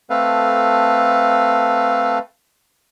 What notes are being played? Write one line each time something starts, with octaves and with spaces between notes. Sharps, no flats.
A3 C4 A4 B4 F5